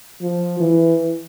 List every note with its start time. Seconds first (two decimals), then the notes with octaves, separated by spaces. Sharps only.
0.22 F3
0.60 E3